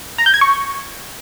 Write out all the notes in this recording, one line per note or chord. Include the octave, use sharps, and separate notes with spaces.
A#5
G6
G#6
C#6